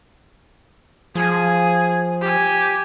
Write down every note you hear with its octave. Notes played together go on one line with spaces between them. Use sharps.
F3 G#4 G#5
G4 G#5